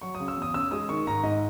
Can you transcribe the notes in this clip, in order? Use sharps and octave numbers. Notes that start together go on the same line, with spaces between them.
F#3 C#6
D#6
C#3
E6
E2
D#6
C#4 E6
G#3 D#6
D#3 C#6
G#2 A#5
G#2 D#5